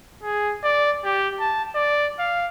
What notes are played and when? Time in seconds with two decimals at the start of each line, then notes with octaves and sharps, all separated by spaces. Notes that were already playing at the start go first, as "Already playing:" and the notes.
0.23 G#4
0.63 D5
1.04 G4
1.40 A5
1.75 D5
2.19 F5